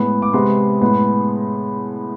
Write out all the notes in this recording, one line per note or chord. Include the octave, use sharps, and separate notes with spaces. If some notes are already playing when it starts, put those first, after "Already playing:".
Already playing: A2 G#3 B3
D6
C3 G#3 B3 C6
A2 G#3 B3